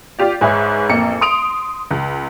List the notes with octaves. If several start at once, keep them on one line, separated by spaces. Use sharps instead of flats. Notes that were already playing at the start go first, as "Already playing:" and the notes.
F4 G4 D5
G#2 G#4 B4 C#5 E5 B5
A1 F2 A#3 C#7
C6 D#6 D7 F7
C#2